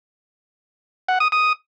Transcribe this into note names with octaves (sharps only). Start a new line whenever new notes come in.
F#5
D#6
D#6